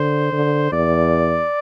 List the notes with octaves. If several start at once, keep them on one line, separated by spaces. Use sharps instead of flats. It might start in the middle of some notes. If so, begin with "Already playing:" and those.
Already playing: D3 C5
D3
E2 D5